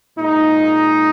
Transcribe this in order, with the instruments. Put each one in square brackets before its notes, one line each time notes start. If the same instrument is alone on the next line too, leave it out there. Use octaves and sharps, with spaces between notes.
[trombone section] A#2 G#3 D#4